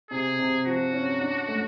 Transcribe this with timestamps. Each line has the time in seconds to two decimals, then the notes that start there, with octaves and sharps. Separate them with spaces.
0.10 C3 G#4
0.39 C3
0.66 F3 F#4
0.93 C#4
1.20 D4
1.48 A3